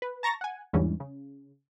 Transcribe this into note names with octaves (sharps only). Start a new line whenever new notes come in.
B4
A5 A#5 C#6 A6 A#6
F#5 G#5
E2 G#2 D3 E3 G3 C#4
C#3